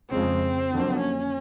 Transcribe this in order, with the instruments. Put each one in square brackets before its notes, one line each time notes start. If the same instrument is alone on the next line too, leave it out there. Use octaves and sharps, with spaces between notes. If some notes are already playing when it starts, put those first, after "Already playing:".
[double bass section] F2 C#3 F3 G#3 [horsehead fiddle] C4
[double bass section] F2 D3 F#3 A#3
[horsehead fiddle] C#4